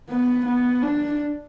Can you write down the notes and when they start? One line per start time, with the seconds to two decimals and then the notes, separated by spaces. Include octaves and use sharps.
0.10 B3
0.46 B3
0.82 D4